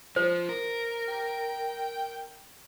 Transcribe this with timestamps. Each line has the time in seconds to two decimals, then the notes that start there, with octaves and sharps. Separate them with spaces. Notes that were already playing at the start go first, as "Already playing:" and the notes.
0.16 F3 C5
0.49 A#4
1.08 G5